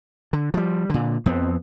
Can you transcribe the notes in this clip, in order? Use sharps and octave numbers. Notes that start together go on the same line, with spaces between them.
D3
F3 G3
A#2 D3
F2 F3 B3 C4